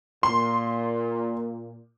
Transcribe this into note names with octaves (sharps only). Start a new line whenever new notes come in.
A#2 C6